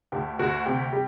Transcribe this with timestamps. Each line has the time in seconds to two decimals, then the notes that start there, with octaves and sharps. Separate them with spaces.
0.12 D2 G4
0.39 D2 F#4
0.66 C3 G4
0.93 G3